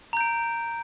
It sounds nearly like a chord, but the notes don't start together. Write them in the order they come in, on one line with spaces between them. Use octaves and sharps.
A#5 G6 D7